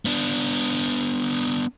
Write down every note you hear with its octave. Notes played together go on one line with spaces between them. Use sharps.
B3 D4